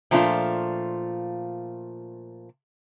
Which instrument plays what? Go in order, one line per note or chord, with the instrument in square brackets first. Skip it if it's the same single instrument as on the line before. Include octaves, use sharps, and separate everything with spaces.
[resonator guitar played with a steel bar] A#2 F3 A3 D4 F4